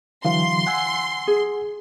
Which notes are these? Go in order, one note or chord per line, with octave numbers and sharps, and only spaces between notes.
D3 E3 F#3 F5 C6
F#5 G#5 E6
G#4